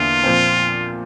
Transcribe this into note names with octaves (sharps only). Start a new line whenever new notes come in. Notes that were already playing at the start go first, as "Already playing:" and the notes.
Already playing: E2 D3 A#3 F4
A#2 F3 C4